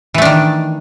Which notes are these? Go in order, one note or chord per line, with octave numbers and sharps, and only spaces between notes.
D#3 E3 A3 D4